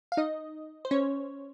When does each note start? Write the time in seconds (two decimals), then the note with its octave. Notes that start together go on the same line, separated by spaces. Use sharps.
0.12 F5
0.17 D#4 D#5
0.85 C5
0.91 C#4 C#5